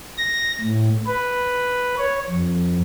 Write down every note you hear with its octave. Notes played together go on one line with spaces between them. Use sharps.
A#6
A2
B4
C#5
F2